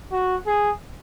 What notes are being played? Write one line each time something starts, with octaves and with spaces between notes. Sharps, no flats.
F#4
G#4